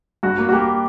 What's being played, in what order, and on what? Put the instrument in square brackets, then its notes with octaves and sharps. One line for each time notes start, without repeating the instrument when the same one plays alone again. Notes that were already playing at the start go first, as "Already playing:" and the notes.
[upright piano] G2 [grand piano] F#4
[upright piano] A#3
[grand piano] F#4
[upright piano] A#3 [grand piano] G4